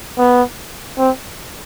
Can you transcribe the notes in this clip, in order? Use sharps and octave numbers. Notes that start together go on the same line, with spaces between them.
B3
C4